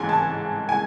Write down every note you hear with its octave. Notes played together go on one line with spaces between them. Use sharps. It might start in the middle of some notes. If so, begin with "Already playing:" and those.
Already playing: A1 G#2 G#5 C6
A5
G#5